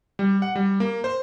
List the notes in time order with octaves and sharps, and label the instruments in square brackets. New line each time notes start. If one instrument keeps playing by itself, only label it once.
[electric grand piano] G3
F#5
G3
A#3
C5